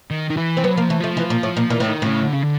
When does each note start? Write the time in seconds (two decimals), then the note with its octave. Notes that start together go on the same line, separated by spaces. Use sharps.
0.11 D#3
0.30 D#3
0.37 E3
0.57 C4
0.64 F#3 B3
0.76 F3 A#3
0.89 E3 A3
1.01 F3 A3
1.17 E3
1.30 A#2
1.43 A2
1.57 A#2
1.70 A#2 E3
1.80 A2
1.88 D#3
2.02 A2 C#3
2.24 D3
2.33 C#3
2.43 D3